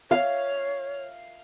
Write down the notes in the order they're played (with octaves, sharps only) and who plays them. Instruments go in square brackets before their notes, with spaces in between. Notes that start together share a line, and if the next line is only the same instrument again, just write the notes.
[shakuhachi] C#5 [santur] F5